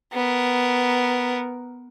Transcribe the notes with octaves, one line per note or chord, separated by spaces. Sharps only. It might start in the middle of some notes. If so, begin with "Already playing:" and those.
B3 A#4